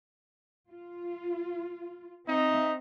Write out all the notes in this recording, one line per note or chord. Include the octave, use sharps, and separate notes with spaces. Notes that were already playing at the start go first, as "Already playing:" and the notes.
F4
C4 D#4 E5